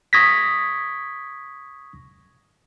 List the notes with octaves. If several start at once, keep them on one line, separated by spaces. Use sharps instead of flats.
C#6 D#6 G#6 A#6 B6